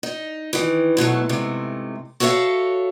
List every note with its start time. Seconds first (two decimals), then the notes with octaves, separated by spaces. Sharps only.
0.03 D#4
0.53 D#3 E3
0.97 G#2 B2 F#3 A3
1.29 G#2 C3 A3
2.20 F#4 A4 C#5 D5 E5 F5